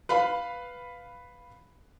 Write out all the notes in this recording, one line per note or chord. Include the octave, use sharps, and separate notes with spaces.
B4 F5 B5